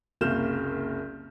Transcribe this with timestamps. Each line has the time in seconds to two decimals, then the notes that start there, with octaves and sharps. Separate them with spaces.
0.21 F#1 C2 A#3 F6 G6 E7